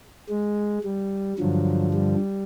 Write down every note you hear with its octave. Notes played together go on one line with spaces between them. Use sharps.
G#3
G3
G2 D3 F3 F#3
G3